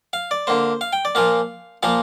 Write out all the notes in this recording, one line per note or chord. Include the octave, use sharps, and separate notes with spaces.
F5
D5
D3 A#3 C5
F5
G5
D5
A#2 F3 A#3 F5
A#2 F3 A#3 F5